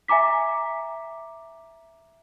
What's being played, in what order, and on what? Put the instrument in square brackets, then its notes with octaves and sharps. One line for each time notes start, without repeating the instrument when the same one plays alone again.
[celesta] E5 G#5 A#5 D6 B6